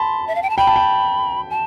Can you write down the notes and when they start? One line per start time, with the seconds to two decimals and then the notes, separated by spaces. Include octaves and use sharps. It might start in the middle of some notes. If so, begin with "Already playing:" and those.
Already playing: A5 B5 C6
0.27 E5
0.35 F5
0.42 G5
0.50 A5
0.58 G5 B5
0.67 A5
0.76 G5
1.50 A5